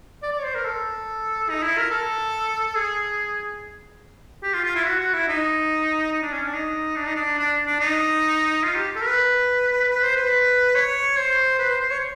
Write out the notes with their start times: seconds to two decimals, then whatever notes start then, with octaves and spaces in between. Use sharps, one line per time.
0.22 D5
0.33 D5
0.40 C#5
0.44 C5
0.55 A#4
0.65 A4
1.49 D#4
1.63 E4
1.78 A#4
1.91 A4
2.75 G#4
4.43 G4
4.54 F4
4.65 F4
4.75 E4
4.85 F#4
5.00 F#4
5.14 E4
5.28 D#4
6.12 D#4
6.23 D4
6.33 C#4
6.43 D4
6.54 D#4
6.96 D4
7.07 D#4
7.16 D4
7.38 D4
7.66 D4
7.80 D#4
8.64 F4
8.75 G4
8.96 A4
9.01 A#4
9.07 B4
9.90 B4
10.03 C5
10.16 B4
10.75 C#5
11.17 C5
11.59 B4
11.70 C5
11.80 C5
11.91 C#5